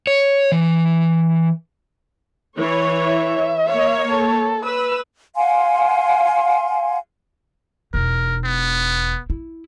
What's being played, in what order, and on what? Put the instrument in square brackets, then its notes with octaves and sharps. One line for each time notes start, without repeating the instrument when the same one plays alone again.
[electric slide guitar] C#5
E3
[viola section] E3 C#5
[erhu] E5
[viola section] A#3 C#5
[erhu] A4
[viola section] B4 [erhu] E6
[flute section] F5 F#5 G#5 C6
[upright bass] E1 D#4 [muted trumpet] A#4
[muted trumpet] B3
[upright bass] E4